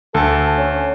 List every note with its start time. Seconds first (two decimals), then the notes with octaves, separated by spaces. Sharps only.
0.15 D2 A4 A5
0.58 C#4